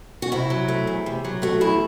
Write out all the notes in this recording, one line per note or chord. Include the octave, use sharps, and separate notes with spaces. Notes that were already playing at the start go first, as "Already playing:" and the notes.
F#4
C3 E4
F#3
A3
E2
C3
F#3
A3 F#4
E2 E4